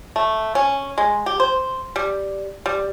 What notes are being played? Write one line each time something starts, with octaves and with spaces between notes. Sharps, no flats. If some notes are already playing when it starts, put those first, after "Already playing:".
A3
C#4
G#3
G4
C5
G3
G3